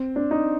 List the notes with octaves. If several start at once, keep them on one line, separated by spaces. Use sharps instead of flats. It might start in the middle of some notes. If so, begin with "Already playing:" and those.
Already playing: C4
D4
D#4